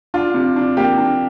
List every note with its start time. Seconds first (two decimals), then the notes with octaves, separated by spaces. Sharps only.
0.14 D4 F4
0.34 C3
0.56 D4
0.77 A#3 G4
0.98 D4